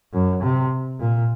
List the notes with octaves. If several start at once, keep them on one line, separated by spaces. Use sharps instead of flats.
F#2
C3
A#2